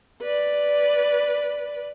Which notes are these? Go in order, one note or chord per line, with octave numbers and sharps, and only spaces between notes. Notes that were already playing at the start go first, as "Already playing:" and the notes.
B4 D5